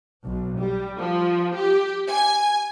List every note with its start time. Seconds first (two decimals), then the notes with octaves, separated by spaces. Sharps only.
0.25 B1
0.59 G3
0.99 F3
1.55 G4
2.09 G#5